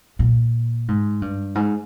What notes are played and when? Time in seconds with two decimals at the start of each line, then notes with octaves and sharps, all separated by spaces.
0.19 A#2
0.88 G#2
1.22 G2
1.55 G#2